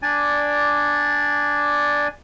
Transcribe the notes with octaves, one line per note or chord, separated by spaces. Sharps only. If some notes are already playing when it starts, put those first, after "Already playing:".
D4 D5 G#5